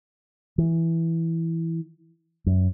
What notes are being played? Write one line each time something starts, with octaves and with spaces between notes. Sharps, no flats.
E3
F#2